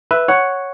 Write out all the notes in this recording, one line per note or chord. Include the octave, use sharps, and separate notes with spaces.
B4 E5
C#5 F#5